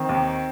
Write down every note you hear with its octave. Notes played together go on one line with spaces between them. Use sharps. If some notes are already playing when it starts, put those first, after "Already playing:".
Already playing: D#3 C4
D#2